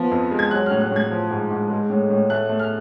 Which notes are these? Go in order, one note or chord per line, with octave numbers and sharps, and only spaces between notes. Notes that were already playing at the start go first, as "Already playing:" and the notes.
Already playing: F3 B3
F2
G#3
G#6
F#3 F#6
A2 F6
F#6
A2
G#6
F3
G#2
G#2
G#3
A2
A2
A3 F#6
A3
F6